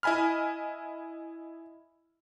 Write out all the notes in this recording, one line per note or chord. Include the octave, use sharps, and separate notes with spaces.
E4 D#5 G#5 B5 F6